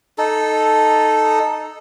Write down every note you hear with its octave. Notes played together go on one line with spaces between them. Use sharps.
D#4 A4